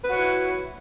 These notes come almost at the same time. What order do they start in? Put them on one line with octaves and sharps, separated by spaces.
B4 F#4 C#5 E4